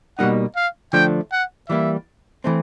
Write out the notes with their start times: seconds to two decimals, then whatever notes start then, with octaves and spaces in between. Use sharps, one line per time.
0.18 B2 G3 A#3 D#4 F#5
0.56 F5
0.93 D3 F3 A3 D4 G5
1.32 F#5
1.69 E3 G3 A#3 E5
2.44 E3 A3 C4